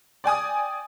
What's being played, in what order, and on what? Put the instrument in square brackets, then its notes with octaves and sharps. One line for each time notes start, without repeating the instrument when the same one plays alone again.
[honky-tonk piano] D5 G5 G#5 D#6